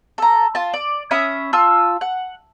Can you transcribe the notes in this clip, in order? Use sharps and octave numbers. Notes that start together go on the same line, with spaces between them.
A4 A#5
F4 A5
D5
C#4 E5 B5 D#6
F4 A5 E6
F#5